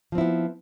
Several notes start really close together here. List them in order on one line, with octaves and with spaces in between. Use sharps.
F3 C4 E4 B3